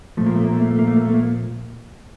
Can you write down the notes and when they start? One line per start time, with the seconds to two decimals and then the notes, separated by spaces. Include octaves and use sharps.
0.17 A#2 F3 A3
0.26 A#3
0.35 A3
0.44 A#3
0.53 A3
0.62 A#3
0.71 A3
0.79 A#3
0.88 A3
0.97 A#3
1.05 A3
1.14 A#3